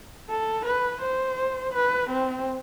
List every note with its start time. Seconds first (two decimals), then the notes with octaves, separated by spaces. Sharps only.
0.29 A4
0.65 B4
1.02 C5
1.73 B4
2.10 C4